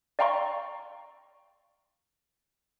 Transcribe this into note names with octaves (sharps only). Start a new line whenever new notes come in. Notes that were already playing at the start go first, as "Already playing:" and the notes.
D5 F5 G5 A#5 C6 C#6